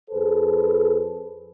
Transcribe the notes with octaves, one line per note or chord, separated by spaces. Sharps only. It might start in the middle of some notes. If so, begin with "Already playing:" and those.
F2 G#4 A4 B4 C5